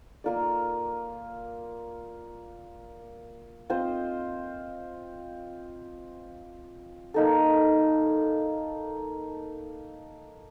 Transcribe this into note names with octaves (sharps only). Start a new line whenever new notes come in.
A#3 F4 A#4 D5
C4 F4 C5 D#5
A#3 D#4 A4